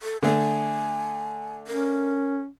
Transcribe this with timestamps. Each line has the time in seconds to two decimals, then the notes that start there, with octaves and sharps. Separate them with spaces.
0.01 A4
0.23 D3 A3 G#5
1.67 C#4 A#4